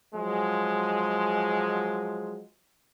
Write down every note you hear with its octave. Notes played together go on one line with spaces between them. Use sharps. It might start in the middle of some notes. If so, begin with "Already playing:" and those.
F3 F#3 G#3